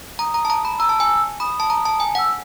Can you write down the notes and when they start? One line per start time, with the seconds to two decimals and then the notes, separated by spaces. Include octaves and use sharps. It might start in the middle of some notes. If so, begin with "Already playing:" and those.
0.19 A#5 D#6
0.34 A#5
0.45 A5
0.50 A#5
0.65 B5
0.79 A#5 E6
0.89 A5
1.00 G#5
1.40 B5 D#6
1.60 A5
1.70 A#5
1.85 A5
2.00 G#5
2.15 F#5 E6